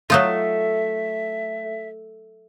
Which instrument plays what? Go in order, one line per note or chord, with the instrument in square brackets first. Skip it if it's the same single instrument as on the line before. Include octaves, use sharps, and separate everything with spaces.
[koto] F#3 D#4 F4 [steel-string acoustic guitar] A3 [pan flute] E5